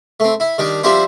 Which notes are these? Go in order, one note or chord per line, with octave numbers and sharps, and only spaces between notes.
A3 C4
E4
D#3 G3 D4
F3 G3 C4 D4 E4 C5